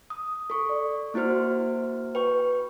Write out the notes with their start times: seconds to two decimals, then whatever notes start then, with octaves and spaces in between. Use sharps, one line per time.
0.10 D#6
0.50 A4 C#6
0.69 D5
1.14 A#3 E4 F#4 C5 F6
2.15 B4 G5 C#6